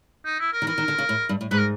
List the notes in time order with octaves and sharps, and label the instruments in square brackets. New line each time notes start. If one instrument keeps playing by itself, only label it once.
[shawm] D#4
E4
A#4
[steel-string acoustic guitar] D#3
[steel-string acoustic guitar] E3 [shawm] A#4
[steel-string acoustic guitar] D#3
D3
C#3
A2
G2
A2
[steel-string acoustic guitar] G#2 [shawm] B4
[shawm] A#4